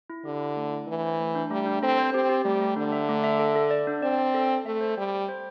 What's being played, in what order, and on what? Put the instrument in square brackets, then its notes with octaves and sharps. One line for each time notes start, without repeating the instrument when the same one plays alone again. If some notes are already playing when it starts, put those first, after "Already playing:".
[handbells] E4
[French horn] D3 [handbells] G4
[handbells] E4
A3
E4
[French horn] E3 [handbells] A3
[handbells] C5
A3
D4
[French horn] G3 [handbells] A3
[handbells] D4
[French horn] C4 [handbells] A4
[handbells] C5
[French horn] C4 [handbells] G4
[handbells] G4
[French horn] G3 [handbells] A3
[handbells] A3
[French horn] D3 [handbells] D4
[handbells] E5
A3
E5
A4
A4
D5
D4
[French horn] C4 [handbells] D5
[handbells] D5
A4
A4
[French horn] A3 [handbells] E5
[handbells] C5
[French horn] G3 [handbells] G5
[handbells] G5
C5